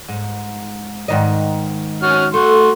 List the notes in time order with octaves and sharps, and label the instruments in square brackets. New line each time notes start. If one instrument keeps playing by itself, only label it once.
[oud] G#2
G#2 D#3 D#5
[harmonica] C#4 F#4 F6
[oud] A3 [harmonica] F#4 C6